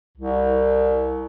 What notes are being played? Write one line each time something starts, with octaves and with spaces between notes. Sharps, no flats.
C2